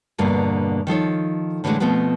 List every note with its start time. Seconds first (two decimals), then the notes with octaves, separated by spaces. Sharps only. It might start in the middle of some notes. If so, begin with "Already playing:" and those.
0.18 E2 G2 B2 D3 A#3
0.87 D#3 F3 A4 C#5
1.64 A2 D3 E3 F#3 G#3 A3
1.80 B2 F3 A3 B3 C4